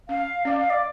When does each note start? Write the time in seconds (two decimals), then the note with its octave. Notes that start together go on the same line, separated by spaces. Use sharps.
0.08 C#4 F5
0.45 C#4 D5
0.58 F5
0.70 D5